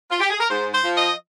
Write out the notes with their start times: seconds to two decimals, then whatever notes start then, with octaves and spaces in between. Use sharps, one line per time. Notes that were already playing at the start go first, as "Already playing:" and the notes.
0.11 F4
0.21 G4
0.30 G#4
0.40 A#4
0.50 G#2 C5
0.72 C5
0.84 F3
0.96 D#5